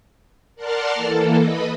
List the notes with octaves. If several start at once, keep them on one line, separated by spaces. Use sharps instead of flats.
A#4 D5 F#5 A5 C6 F6
E3 A#3 A4
B4 D#5 B5